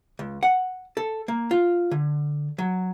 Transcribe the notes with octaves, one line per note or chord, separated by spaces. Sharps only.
C#2
F#5
A4
A#3
F4
D3
F#3